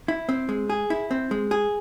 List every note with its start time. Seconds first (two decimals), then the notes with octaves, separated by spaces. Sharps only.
0.08 E4
0.29 C4
0.49 G#3
0.70 G#4
0.90 E4
1.11 C4
1.31 G#3
1.51 G#4